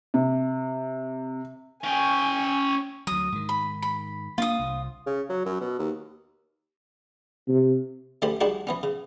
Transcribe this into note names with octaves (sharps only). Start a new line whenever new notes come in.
C3
C#4 G5 G#5
D2 F#3 D#6
G#2 D#3
B5
B5
A#3 C#4 D4 F4 D#6
C2
C#3
F#3
F#2
B2
D#2
C3
D3 A3 C#4 G4 C5 B5
G3 G#3 D4 D#4 F#4 G4
E3 B3 C#4
C#3